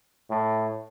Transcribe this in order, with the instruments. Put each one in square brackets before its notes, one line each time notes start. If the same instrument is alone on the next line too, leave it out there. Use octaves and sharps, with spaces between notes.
[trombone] A2